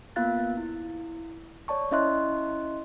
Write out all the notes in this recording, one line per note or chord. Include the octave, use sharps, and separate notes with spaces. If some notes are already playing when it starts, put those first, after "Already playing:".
A#3 B3 F4 F5 F#6 A6
E4
C#5 D5 A5 C#6
C#4 E4 D#5 E5 C6 F#6